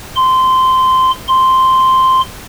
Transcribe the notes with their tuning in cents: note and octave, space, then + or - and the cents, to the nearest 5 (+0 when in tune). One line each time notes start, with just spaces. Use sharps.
C6 -15
C6 -5